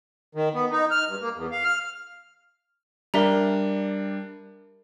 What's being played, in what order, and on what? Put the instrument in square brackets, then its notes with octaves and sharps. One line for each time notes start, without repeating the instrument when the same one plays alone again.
[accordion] D#3
B3
D#4
F6
G2
A#3
E2
F5
F6
[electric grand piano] G3 D4 [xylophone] A#4 E5 A#5